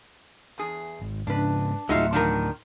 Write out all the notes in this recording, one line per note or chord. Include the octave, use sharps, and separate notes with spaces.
E2 G#4
G#1
G#2 C#3 D4 B4
D2 A2 G#3 D#4 F4 F#4 E5
B2 D#3 F3 D4 A#4